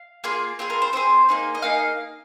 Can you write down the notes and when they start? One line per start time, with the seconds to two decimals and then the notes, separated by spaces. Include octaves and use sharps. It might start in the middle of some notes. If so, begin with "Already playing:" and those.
Already playing: F5
0.24 A#3 F4 G#4
0.59 C4 F4 G#4
0.70 A#4
0.82 C5
0.93 C4 F4 G#4 C5
1.29 A#3 D#4 G#4
1.55 D#5
1.62 A#3 D#4 G#4 F5